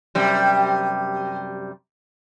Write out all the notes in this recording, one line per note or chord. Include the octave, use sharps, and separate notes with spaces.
F#2 C3 G3